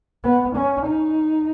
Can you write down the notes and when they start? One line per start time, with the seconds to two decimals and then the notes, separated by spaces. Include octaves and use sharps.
0.24 B3
0.56 C#4
0.86 D#4